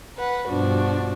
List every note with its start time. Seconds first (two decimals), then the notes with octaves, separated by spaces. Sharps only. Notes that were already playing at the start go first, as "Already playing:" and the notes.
0.17 B4 F#5
0.48 G2 B2 F3 D4 F#4